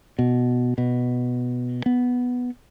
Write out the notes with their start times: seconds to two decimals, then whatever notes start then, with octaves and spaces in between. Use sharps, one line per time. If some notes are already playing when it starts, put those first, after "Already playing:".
0.19 B2
0.78 B2
1.86 B3